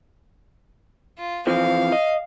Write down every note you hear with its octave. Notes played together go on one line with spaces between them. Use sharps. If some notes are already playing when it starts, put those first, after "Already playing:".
F4
E3 F3 C4 F5
D#5